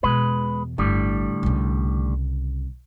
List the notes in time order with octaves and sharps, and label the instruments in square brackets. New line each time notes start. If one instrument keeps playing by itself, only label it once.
[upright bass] E2 B2 [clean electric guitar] G#3 B4
[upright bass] G1 [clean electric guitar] A2 D3 G3
[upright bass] C2 C#3